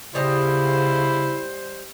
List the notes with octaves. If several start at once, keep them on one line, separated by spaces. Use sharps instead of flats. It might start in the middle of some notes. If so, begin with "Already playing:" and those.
C#3 G3 E4 G4 C5 D#5